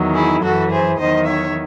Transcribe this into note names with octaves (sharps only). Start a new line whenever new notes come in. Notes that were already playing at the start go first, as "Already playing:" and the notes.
Already playing: E2 D#3 F#3
E4 G#4
F#2 E3 F#4 A4
G#4 C5
E2 D#3 F#3 C5 D#5
C#5 E5